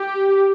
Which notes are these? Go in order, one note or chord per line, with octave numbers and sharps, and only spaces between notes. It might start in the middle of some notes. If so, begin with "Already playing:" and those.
Already playing: G4